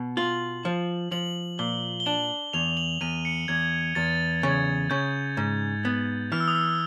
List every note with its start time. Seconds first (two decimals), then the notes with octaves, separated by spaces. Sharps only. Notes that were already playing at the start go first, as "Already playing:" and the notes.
Already playing: B2
0.17 F4 F#7
0.65 F3
1.11 F3 F#7
1.59 A#2 G7
2.00 G7
2.06 D4 F#7
2.53 E2 F7
2.77 F#7
3.01 E2 D#7
3.25 C#7
3.48 E2 G#6
3.95 E2 A6
4.43 C#3 G#6
4.90 C#3 G6
5.37 G#2
5.85 B3
6.32 E3 F6
6.40 E6
6.48 D#6
6.55 E6